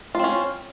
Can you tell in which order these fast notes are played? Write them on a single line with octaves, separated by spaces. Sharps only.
F4 C4 C#4